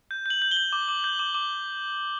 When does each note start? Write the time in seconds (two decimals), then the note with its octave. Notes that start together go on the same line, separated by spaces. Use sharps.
0.11 G6
0.26 G6 F#7
0.42 G6
0.51 G7
0.57 G6
0.73 D6
0.89 D6
1.04 G6
1.19 D6
1.34 D6